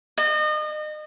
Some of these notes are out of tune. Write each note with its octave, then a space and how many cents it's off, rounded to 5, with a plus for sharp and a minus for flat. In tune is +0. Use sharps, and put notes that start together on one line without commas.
D#5 -35